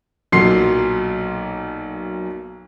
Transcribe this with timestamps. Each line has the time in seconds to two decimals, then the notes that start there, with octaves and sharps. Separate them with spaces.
0.32 B1 A#2 F#3 C6 C7